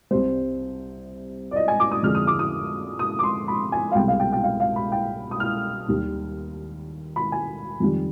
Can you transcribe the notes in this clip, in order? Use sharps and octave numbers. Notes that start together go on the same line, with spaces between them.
C2 C3 G3 C5
D5
D#5
G#5
D6
D#6
F2 D3 G#3 F6
D#6
D6
D#6
D#6
D6
C6
B5
G#5
F5
C2 B2 G#3 G5
F5
G5
G5
F5
F5
B5
G5
D#6
F6
D#2 D#3 G3
B5
G#5
F2 D#3 G3